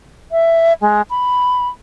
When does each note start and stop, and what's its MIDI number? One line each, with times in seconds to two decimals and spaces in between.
0.32 0.73 76
0.81 1.02 56
1.10 1.68 83